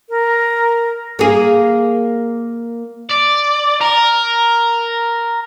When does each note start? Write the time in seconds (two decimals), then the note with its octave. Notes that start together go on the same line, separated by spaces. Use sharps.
0.10 A#4
1.19 A#3 G#4
3.09 D5
3.81 A#4